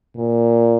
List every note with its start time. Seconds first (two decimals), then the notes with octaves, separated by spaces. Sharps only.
0.16 A#2